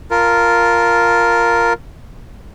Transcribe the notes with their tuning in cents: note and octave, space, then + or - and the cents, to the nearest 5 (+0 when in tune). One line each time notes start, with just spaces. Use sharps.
F4 +0 A#4 +0 A5 -10